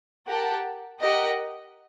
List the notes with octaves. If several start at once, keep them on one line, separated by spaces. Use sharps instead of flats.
G4 A#4 F#5 A5
G4 A#4 D#5 F#5